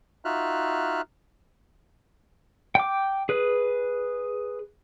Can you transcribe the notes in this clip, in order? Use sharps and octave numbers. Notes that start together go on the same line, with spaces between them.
D#4 F4 F#4 E5 F6 F#6
G5 D6
G#4 B4